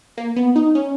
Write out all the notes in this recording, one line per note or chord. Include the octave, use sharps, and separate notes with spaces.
A#3
B3
D#4
C#4